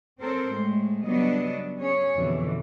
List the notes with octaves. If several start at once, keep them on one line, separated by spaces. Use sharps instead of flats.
C4 A4 A#4 C5
A2 G#3 A3
C#3 F#3 G3 B3 D4 D#5
C#4 G#4 C#5
F2 B2 D3 E3